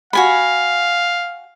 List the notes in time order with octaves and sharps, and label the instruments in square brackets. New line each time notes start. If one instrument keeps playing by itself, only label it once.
[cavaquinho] F#4 G#5 B5 [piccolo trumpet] F5